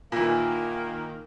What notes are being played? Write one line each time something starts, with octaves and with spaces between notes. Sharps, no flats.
A#2 D#3 E3 A#3